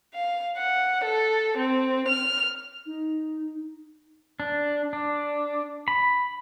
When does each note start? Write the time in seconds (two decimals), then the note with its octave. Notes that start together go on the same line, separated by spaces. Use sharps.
0.15 F5
0.57 F#5
1.04 A4
1.57 C4
2.08 F6
2.86 D#4
4.40 D4
4.93 D4
5.88 B5